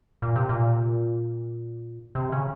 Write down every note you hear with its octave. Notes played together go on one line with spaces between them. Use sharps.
A#2
C3
A#2
C3
C#3